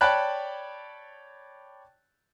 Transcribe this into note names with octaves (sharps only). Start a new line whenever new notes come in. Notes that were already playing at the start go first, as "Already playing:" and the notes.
C#5 D5 G5 A5 B5 F#6